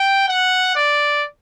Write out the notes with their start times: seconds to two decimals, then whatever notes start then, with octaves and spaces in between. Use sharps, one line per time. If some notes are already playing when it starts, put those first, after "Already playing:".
Already playing: G5
0.28 F#5
0.76 D5